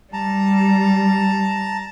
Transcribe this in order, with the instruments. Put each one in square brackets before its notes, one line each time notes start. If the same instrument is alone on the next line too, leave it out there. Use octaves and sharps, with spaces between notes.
[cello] G3 [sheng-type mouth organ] A5 A#5